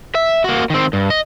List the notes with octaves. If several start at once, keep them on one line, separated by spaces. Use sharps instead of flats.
E5
A#3 F#4
D#3 C4
G2
D#5